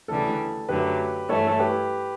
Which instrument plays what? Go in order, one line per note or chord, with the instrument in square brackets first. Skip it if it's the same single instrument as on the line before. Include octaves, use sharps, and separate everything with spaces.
[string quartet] D2 C#3 E3 G3 D4 [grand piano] A4
[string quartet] F#2 D3 F#3 A3 [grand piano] G4 B4
[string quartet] G2 E3 A3 [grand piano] A4 C#5
[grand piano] A4
G4 B4